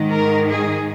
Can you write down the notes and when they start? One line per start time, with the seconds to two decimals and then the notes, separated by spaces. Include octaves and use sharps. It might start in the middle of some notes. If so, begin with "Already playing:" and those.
Already playing: G#2 D#3
0.12 A#4
0.49 G#4